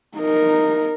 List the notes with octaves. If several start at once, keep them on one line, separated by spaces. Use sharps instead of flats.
D#4 A#4